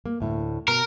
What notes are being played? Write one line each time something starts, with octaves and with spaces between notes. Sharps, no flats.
A#3
D2 A2
B2 A#4